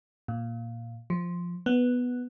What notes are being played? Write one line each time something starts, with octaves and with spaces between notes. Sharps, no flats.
A#2
F3
B3